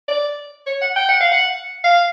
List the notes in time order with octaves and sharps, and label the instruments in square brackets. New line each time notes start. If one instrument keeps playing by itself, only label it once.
[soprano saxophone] D5
C#5
F#5
G5
F#5
F5
F#5
F5